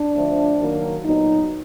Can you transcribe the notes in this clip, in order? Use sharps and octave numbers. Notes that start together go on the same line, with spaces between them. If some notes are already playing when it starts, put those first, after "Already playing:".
Already playing: D4
D3 F3 A3 C4
D#3 F#3 A#3
A#2 F#3 B3 D#4